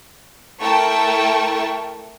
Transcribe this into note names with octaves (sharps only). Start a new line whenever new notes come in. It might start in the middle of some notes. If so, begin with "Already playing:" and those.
A3 E4 A#4 G5 A5 C#6